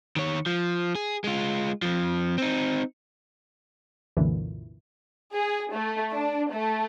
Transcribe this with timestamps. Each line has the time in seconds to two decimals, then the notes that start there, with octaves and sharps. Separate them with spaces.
0.16 D#3 C#5
0.46 F3
0.95 G#4
1.24 G#3 F4
1.82 F2 F3
2.38 C4 D#4
4.17 C2 F#2 A#2 D3 E3
5.34 G#4
5.73 A3
6.12 D4
6.53 A3